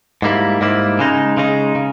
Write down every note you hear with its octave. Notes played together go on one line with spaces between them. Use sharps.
G#2 G3 A#3 E4
G#2 G3 A#3 E4
C#3 G#3 D#4
C#3 G#3 D#4
C#3